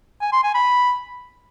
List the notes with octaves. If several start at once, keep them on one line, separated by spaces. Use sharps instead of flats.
G#5
C6
G#5
B5